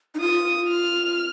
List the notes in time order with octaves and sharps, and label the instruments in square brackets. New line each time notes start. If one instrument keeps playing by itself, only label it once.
[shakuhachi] D#4
[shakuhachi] F4 [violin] D#6
[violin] F6